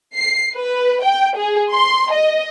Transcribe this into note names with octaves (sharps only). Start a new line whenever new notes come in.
C7
B4
G5
G#4
C6
D#5